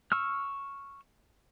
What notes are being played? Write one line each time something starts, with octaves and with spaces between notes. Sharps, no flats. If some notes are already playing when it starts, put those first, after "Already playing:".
C#6 E6 F6